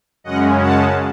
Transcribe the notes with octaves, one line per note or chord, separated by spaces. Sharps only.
F#2 C#3 G#3 C#4 D#5 F#5
F#5 A5